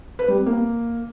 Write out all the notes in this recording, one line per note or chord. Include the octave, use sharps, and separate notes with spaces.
B4
G3
C4
A#3